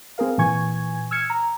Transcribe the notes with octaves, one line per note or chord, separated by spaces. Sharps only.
C4 G#4 A#4 F5
A#2 E3 G#5 C#6 G#6
E6 F6 G#6 C#7
A#5